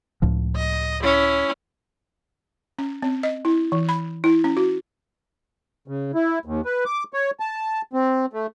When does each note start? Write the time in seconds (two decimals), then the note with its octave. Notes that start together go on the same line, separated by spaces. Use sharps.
0.22 C#2 A2 F3
0.56 D#5
1.03 C#4 E4
2.79 C#4
3.02 C4
3.23 D#5
3.45 E4
3.72 E3
3.89 B5
4.24 E4
4.44 C#4
4.57 F#4
5.88 C#3
6.14 E4
6.45 D#2
6.65 B4
6.85 D6
7.13 C#5
7.40 A5
7.93 C4
8.33 A3